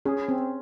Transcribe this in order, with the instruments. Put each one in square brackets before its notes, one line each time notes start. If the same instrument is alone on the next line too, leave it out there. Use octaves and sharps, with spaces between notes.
[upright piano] C#4 [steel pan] G#4
[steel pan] C4